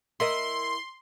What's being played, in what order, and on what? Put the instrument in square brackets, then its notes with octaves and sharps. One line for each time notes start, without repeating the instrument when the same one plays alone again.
[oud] E4 A#4 D#5 [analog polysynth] C6